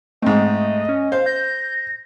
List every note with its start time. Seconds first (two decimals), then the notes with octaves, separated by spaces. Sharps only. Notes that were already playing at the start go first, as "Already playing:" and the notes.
0.22 G#2 A3 C4 D#5
0.89 C#4
1.12 C5 F5
1.26 G6 A#6